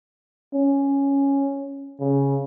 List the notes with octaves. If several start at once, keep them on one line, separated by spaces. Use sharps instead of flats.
C#4
C#3